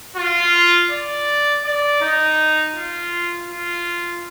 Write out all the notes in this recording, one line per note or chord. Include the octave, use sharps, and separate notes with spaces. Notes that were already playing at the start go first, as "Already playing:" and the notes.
F4
D5
D5
D#4
F4
F4